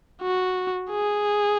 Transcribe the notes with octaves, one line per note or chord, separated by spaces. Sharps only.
F#4
G#4